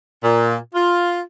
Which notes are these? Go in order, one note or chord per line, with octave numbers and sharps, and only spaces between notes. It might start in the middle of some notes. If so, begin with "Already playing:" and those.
A#2
F4